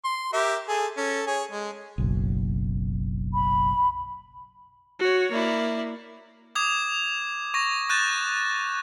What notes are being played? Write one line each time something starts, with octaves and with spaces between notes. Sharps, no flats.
C6
G4 A#4 E5
G#4 A4
C#4 A4
G#4 C#5
G#3
F#1 B1
B5
F#4 C#5
A#3 E4 D5
D6 D#6 G#6 F7
C#6 A#6
C#6 F#6 G6 A6 E7